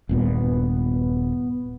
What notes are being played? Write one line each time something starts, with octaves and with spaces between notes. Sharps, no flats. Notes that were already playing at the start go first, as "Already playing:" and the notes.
D#1 G2 A#2 B3